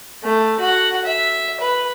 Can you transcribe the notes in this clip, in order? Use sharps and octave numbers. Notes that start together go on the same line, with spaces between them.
A3
F#4 F#5
E5
B4